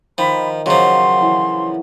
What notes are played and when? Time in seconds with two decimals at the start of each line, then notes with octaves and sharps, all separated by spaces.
0.18 D#3 F3 B5
0.66 C#3 F3 F#3 C6
1.21 E3